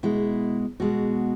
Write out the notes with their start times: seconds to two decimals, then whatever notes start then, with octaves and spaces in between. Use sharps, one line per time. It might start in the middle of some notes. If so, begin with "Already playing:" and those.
0.03 B2 G#3 E4
0.80 B2 G#3 F#4